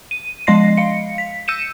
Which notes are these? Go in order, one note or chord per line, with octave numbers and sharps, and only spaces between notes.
D#7
F3 G#3 D#5 C6 A#6 C7
F5 C#7
B6
E6 G6 C#7 D#7 E7